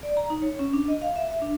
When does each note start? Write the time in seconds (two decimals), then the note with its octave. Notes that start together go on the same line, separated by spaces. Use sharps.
0.03 D5
0.17 A#5
0.30 D#4
0.42 C#5
0.59 C#4
0.73 D4
0.88 D#5
1.02 F5
1.16 E5
1.30 E5
1.42 D4